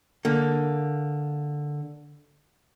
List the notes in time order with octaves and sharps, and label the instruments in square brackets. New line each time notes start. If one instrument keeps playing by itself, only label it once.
[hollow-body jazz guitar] D3 A#3